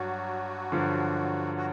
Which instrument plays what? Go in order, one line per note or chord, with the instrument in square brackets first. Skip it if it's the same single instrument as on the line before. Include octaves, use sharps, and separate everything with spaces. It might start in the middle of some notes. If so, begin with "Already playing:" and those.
Already playing: [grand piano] G2 [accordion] F#3 F#4
[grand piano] G2 D3 F3
[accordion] F#4